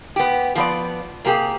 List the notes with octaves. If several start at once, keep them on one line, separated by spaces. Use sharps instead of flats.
B3 G4
F3 B3 D5
C3 A#3 G4 G#4